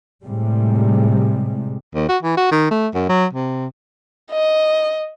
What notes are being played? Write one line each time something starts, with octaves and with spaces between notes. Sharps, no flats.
A2 C3 G3 G#3
D#2
F#4
E3
F#4
D#3
A3
F#2
F#3
C3
D#5